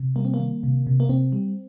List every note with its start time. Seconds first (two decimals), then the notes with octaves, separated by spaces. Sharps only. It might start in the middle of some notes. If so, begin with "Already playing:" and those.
Already playing: C3
0.16 G3 A#3
0.25 C4
0.34 A#3
0.40 D#3
0.63 C3
0.87 C3
1.00 A#3
1.09 C3 C4
1.32 G3